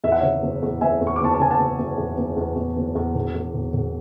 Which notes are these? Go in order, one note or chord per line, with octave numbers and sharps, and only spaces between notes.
E2 E5
F#5
C#3 C#5 E5
F#1
E2
F#1 E5 G#5
E2
C#6
D6
F#1 A5 C#6
A5
C#3 G#5
F#5 A5
F#1
F#1
E2
F#1
E2
E2
F#1
E2
E1
E2
E1
E1